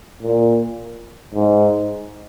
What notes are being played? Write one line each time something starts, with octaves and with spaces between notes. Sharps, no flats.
A#2
G#2